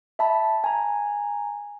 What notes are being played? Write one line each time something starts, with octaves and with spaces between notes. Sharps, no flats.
E5 A5 B5
G#5 A#5